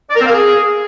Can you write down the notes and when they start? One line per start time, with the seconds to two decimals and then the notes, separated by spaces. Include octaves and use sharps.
0.10 D5
0.15 A#4
0.20 C4
0.26 F5
0.31 G#4